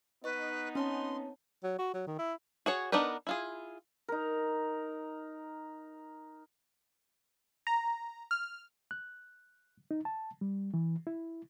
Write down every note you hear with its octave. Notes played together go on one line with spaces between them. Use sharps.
B3 D#4 B4 D#5 C#6
C4 C#4 C#5 A5 C6
F#3
F#4
F#3
D#3
E4
F#4 G#4 C#5
B3 D4 D#4 A#4 B4
E4 F4 G#4
D#4 A#4
A#5
F6
F#6
D#4
A5
G3
E3
E4